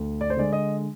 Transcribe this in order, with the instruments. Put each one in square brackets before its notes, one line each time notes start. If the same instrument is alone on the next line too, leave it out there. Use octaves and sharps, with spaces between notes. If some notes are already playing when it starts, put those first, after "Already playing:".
Already playing: [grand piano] D2
D5
C5
D3 G#3 D5
D#5